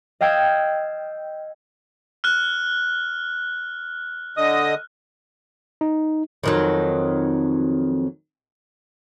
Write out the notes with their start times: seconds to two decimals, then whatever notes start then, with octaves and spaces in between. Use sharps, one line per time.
0.21 D#5 F5 G5 E6 G#6 A6
2.24 F6 F#6
4.37 D3 D#5 D#6
5.81 D#4
6.43 F2 D#3 F#3